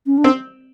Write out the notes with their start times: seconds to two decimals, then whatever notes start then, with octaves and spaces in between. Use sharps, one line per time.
0.06 C#4
0.18 D4
0.24 C4